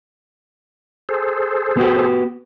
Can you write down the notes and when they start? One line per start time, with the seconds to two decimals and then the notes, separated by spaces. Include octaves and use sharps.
1.09 G#4 A4 C5
1.77 B3 F#4 G4